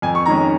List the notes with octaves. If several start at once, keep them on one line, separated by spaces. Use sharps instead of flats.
F2 G#5
C#6
D#3 G#3 C#4 A#5